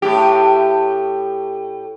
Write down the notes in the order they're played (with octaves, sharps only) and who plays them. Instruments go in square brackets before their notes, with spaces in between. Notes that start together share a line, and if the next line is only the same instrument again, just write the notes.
[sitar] A2 G4